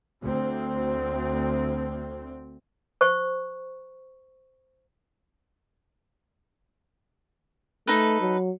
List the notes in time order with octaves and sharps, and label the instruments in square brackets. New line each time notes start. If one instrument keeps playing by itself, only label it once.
[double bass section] D2 C4
[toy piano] C5 C#6
[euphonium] A3 [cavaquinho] D#4 A4 B4
[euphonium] F#3